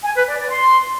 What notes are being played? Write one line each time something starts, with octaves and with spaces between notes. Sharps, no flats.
G#5
B4
D5
D5
C6